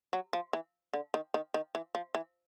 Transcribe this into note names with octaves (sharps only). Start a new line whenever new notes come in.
F#3
F3
E3
D3
D#3
D#3
D#3
E3
F3
E3